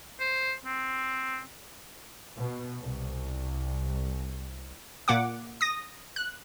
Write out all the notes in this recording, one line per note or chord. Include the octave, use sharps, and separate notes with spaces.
C5
C4
B2
C2
A#2 A#3 F#5 D6
D#6 A#6
F#6